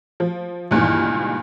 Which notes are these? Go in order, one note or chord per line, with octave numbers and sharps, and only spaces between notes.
F3
C#2 G2 A#2 D#3 E3